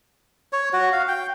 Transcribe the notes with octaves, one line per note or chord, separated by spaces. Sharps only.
C#5
F#4
F5
G5